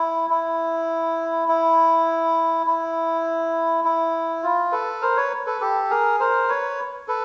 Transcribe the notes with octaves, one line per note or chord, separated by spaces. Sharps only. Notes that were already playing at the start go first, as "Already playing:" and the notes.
Already playing: E4
E4
E4
E4
E4
F4
A4 B4
A#4 C5
B4 C#5
A4 B4
G4 A4
G#4 A#4
A#4 C5
B4 C#5
A4 B4